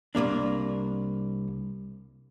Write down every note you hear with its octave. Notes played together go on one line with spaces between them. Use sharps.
C2 F#2 A#3 D4